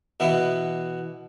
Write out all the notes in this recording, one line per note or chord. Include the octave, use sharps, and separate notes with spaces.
B2 E3 B3